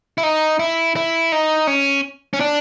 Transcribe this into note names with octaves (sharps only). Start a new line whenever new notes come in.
E4
D#4
E4
E4
D#4
C#4
C#4
D4